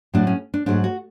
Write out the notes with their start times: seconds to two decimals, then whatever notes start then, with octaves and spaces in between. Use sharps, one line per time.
0.14 A2 F#3 A3 D4
0.27 C#4
0.54 D4
0.66 G#2 F#3 A3 D4
0.84 F#4